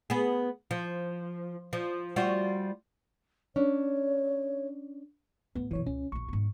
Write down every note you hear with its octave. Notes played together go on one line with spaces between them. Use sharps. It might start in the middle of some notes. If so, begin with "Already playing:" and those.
B3 G#4
F3
F3
G3 F4 F#4
C#4 D4 C#5
D2 A2 B3
F#2 B2 E3 C#5
C#2 C#4
A#1 E2 C#6
G#2 B3